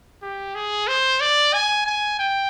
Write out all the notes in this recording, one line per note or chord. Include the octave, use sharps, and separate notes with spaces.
G4
G#4
C5
D5
G#5
G#5
G5